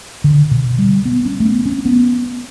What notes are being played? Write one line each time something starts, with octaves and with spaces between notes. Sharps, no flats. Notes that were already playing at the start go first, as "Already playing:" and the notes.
D3
B2
G3
B3
C#4
A3
B3
C#4
B3